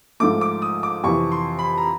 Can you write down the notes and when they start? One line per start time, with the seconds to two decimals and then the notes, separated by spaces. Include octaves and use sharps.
0.20 G#2 F3 A3 D6
0.41 D6
0.62 D#6
0.83 D6
1.04 F2 C3 E3 C#6
1.32 C6
1.59 B5
1.78 A#5